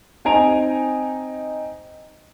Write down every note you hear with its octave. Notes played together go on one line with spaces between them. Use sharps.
C4 D#4 G#5 A#5 D7 F7